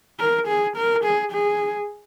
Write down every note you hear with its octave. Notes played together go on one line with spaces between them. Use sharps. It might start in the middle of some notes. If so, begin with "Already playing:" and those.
A#4
G#4
A#4
G#4
G#4